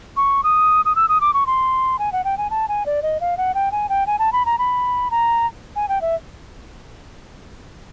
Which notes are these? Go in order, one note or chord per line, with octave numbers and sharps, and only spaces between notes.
C#6
D#6
D#6
E6
D#6
D6
C#6
C6
G#5
F#5
G5
G#5
A5
G#5
D5
D#5
F5
F#5
G5
G#5
G5
G#5
A5
B5
A#5
B5
A#5
G#5
G5
E5